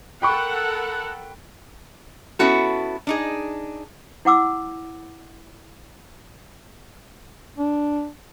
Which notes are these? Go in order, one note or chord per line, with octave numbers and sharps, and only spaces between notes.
A4 A#4 F#5 G5 B5 C#6
B3 C#4 E4 F#4 A4
D4 D#4 G#4
E4 F#5 D6 E6
D4